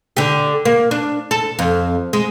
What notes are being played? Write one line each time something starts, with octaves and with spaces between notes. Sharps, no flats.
D3 G4
A#3
D4
A4
F2
G#3